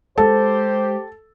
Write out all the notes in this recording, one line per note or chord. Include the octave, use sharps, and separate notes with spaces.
G#3 G4 A4 C5